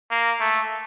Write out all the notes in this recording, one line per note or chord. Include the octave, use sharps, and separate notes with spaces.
A#3
A3